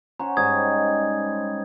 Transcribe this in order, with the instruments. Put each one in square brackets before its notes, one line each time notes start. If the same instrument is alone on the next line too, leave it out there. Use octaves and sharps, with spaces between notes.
[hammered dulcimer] C#4 C5 F#5 [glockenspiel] A#5
[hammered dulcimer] G#2 G3 D#4 [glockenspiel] D#6 G#6